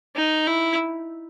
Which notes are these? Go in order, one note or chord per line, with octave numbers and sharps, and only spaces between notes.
D#4
E4